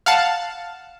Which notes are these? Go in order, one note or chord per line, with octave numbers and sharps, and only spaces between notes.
F5 F#5 A5